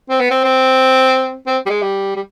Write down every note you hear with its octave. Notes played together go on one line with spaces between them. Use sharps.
C4
B3
C4
C4
C4
G3
G#3
G3
G3